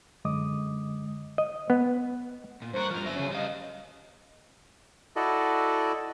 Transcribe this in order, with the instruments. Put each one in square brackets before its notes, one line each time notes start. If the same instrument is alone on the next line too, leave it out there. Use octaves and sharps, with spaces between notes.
[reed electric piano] F#2 D3 G#3 D#5 D6 D#6
[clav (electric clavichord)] D#5
B3
[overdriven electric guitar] A#2
[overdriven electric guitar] G2 A#4 [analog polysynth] C5 C#6 F#6
[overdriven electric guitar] G2 F3 [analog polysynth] F6
[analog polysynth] G1 A#6 [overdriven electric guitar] F#3 E5
[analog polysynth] C#3 C#4
[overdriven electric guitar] G3 F5 [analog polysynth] D#5
[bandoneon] E4 F#4 A4 D5 D#5